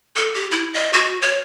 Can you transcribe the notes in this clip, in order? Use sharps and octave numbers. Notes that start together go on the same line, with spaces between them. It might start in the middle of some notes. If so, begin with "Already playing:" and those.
A4
G4
E4
D#5
F#4
C#5